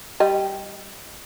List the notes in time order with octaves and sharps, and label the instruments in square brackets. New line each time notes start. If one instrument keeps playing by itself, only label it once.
[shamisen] G3 D#5